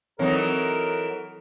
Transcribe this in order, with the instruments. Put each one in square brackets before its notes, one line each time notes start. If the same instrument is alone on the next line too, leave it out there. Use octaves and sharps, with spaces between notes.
[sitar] E3 F#3 D#4 [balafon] C4 C#5 [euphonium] A4 [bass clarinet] A#4